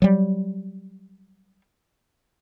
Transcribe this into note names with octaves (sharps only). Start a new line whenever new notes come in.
F#3 G3